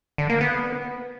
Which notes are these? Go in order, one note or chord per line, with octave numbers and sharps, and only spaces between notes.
D3
A#3
B3